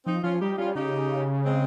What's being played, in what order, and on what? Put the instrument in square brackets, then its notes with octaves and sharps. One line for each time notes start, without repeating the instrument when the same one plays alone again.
[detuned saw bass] F3 [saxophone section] C4 D#4
[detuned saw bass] F3 [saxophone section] C#4 F4
[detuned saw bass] G3 [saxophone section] D#4 G4
[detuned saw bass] G3 [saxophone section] C#4 F4
[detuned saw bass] C#3 [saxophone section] D#4 G4
[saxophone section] G#3 C4